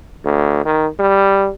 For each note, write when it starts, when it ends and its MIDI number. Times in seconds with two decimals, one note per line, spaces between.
0.25 0.64 38
0.65 0.87 51
0.99 1.50 55